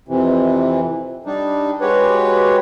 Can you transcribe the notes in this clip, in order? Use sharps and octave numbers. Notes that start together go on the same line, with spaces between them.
F2 C3 E3
G3 D4 D#4
G#3 F#4 G4 B4 C#5